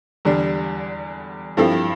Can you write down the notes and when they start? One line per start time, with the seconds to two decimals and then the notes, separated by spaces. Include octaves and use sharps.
0.25 E2 D3 G3 D4
1.57 G2 F3 C4 E4 A4